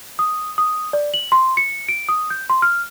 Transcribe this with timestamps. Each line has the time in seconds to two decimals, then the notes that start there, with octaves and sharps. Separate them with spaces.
0.19 D#6
0.58 D#6
0.93 D5
1.14 F#7
1.32 C6
1.57 C#7
1.89 D7
2.09 D#6
2.30 G6
2.50 C6
2.62 F6